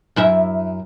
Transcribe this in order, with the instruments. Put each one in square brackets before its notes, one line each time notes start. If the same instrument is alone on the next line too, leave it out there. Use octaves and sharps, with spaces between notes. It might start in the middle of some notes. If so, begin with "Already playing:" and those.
[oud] F#2 E4 E5